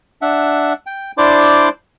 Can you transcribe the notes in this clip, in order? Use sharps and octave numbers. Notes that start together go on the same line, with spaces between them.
D4 E5 F#5
G5
D4 E4 C5 D5 C6 D6